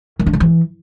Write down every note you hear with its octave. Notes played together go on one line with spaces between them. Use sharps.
D#3
D4
C#3
E3